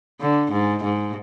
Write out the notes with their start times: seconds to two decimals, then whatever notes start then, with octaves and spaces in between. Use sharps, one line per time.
0.20 D3
0.52 G#2
0.84 G#2